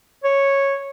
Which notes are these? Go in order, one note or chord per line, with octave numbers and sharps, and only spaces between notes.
C#5